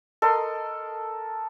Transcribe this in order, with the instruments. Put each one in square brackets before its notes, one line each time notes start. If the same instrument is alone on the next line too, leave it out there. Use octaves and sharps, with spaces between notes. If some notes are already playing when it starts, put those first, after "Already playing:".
[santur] A4 A#4 D#5 C6